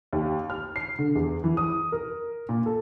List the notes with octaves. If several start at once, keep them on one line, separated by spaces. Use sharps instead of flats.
D#2
F6
C7
D3
E2
E3
D#6
A#4
A#2
A4